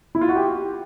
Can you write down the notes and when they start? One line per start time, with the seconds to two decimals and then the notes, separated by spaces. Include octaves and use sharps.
0.15 E4
0.21 F4
0.29 F#4
0.36 G4